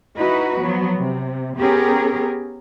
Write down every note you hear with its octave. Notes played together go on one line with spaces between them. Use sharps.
D#4 E4 F#4 B4
F3 F#3 B3
C3
B3 C#4 G4 G#4 A#4